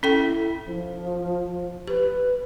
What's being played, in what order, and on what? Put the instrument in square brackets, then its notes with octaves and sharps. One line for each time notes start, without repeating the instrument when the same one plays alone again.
[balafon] C#4 A4 G5 [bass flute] E4
[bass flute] F3
[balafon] G4 [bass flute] B4